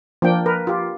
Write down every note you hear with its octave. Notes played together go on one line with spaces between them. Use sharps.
F3 A#3 D4 G5
A#4 B4
F4 G4